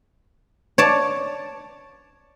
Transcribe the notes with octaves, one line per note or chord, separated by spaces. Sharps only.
C#5 D5 A5